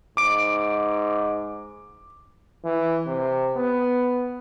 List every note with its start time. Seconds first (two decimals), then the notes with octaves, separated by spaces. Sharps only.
0.17 G#2 D6 D7
2.65 E3
3.07 C3
3.57 B3